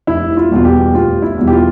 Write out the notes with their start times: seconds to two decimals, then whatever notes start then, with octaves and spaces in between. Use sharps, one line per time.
0.07 F1 E4
0.37 F4
0.51 E2 B2 G3 F4
0.65 G4
0.94 F1 F4
1.22 E4
1.37 E2 B2 G3
1.47 G4
1.52 F4